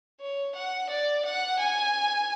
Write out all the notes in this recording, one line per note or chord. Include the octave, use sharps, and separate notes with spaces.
C#5
F#5
D5
F#5
G#5